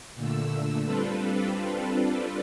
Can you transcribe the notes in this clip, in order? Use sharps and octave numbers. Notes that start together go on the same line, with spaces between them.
A#2 D3 A3 E6
G3 C4 D4 F4 A4 B4